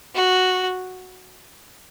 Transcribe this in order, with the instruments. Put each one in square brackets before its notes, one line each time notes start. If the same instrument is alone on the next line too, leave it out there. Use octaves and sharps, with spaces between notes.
[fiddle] F#4